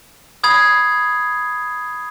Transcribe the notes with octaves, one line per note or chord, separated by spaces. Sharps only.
B5 D#6 G#6 C7